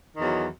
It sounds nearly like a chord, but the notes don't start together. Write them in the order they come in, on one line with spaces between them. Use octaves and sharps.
D#3 E2 F#3